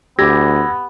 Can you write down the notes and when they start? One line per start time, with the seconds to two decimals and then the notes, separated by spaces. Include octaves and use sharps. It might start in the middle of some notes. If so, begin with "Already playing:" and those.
0.19 D2 B3 G4 E6 G#6 A#6